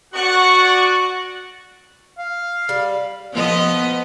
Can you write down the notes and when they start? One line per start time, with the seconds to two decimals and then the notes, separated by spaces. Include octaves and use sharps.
0.14 F#4 D5 F#5 C#6 F#6
2.19 F5
2.69 G3
3.33 F3 B3 D#5